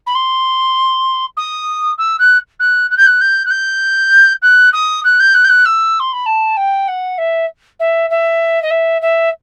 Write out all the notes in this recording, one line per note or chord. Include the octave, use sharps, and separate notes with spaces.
B5
C6
D#6
E6
F#6
F#6
F#6
G6
F#6
G6
F#6
G6
F#6
D#6
F#6
G6
F#6
G6
F#6
E6
C6
B5
A5
G5
F#5
E5
E5
E5
D#5
E5
E5